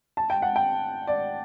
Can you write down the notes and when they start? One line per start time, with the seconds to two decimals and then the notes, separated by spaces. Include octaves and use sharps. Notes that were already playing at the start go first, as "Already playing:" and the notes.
0.17 A5
0.30 G5
0.42 F#5
0.56 G5
1.07 D5